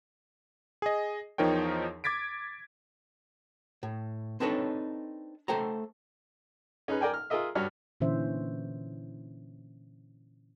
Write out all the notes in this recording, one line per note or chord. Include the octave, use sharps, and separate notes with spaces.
G#4 D#5
E2 F3 D#4 A#4 C#5 G5
D6 G#6 A6 B6 D7
A2
C4 D4 D#4 A4 B4 C#5
A3 A4 C5 G5 A#5
C#4 D#4 G#4 B4
A#4 D5 G5 G#5
F6
F4 G#4 A#4 D#5 E5
G2 D4 F#4 C#5 F6
A#2 D3 E3 C#4 C5 E5